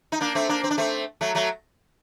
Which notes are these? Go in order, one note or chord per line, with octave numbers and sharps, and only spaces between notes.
D#4
A#3 D4
A3 C4
A#3 D4
C4
D4
A3 C4
F#3 A3
F#3 A3